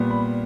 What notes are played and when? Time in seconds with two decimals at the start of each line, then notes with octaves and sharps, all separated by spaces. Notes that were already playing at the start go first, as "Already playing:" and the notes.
Already playing: A#2 G3 B3
0.11 B5